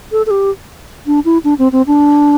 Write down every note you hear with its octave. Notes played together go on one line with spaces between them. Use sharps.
A4
A4
G4
D4
E4
D4
C4
C4
D4